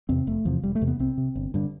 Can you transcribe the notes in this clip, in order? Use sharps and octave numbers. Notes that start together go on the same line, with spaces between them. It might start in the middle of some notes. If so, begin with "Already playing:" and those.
E2 C3 C4
F1 A3
E2 C3 F3
E1 G3
A3
E2 C3
B3
C2 C4
C3
G1
G2 D3